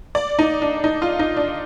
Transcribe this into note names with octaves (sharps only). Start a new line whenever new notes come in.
D5
D#4
D4
D#4
F4
D#4
D4